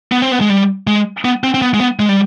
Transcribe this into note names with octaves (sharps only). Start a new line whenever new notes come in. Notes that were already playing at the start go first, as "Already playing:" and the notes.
B3
C4
B3
G#3
G3
G#3
B3
C4
C4
B3
G#3
B3
G#3
G3